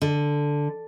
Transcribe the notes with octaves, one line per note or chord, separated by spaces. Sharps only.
D3